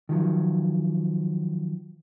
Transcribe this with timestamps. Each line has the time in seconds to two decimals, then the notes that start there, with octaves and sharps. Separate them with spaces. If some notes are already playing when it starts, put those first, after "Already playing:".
0.09 D#3 F3 F#3